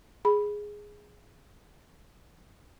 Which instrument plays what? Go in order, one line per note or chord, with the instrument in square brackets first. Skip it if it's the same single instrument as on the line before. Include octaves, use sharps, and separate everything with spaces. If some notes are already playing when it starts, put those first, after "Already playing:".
[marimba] G#4 B5